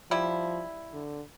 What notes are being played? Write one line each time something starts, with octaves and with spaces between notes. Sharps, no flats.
F3 G3 E4
D3